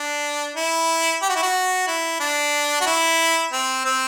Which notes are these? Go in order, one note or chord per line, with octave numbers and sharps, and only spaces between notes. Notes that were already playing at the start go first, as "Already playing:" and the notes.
Already playing: D4
E4
G4
F#4
E4
F#4
E4
D4
F#4
E4
C4
C4